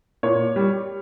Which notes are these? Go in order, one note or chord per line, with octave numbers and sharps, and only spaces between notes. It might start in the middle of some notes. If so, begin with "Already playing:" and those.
A#2 C#5
G3